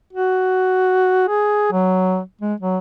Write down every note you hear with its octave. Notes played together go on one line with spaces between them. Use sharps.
F#4
G#4
F#3
G#3
F#3